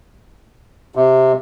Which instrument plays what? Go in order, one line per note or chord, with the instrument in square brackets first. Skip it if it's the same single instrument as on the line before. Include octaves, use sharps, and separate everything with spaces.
[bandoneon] C3